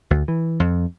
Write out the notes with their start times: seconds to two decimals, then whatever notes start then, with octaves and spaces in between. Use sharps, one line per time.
0.10 D2
0.28 E3
0.60 F2